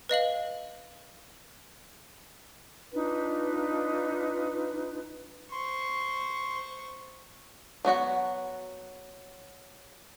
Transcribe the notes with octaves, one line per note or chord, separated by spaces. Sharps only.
B4 D#5 F5 F#7
D4 D#4 F4 B4
C5 C6 C#6
F#3 B3 F#4 F#5